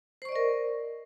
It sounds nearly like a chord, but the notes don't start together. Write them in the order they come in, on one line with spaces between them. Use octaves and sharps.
C5 C#6 D5 D#5 A#4